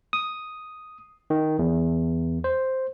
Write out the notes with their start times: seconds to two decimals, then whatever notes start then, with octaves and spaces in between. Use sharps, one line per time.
0.13 D#6
1.30 D#3
1.59 E2
2.44 C5